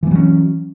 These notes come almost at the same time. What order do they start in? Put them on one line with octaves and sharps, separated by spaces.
E3 A3 F#3 C#4